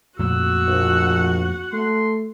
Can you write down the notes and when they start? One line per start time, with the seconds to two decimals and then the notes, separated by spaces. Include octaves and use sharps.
0.19 F2 A#2 A3 F#4 F#5 E6
0.67 A#1
1.73 A3 C6